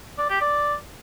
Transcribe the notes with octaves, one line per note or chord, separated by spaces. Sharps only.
D5
G4
D5